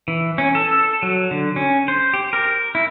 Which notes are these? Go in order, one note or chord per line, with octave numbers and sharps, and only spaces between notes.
E3
C#4
A4
F#3
D3
C#4
C5
G4
A#4
E4